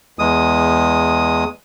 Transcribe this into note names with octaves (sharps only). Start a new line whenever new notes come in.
E2 G#3 D#6